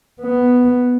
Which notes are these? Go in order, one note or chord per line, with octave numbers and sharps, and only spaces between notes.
B3